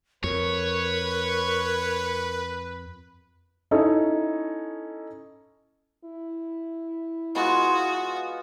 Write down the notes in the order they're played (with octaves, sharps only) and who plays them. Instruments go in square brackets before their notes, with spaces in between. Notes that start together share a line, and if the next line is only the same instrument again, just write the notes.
[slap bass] F2 [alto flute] A#4 [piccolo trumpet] B4 [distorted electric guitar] C#5
[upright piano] C#4 D#4 E4 A4
[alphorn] E4
[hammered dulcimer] G#3 B3 F4 [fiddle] F#4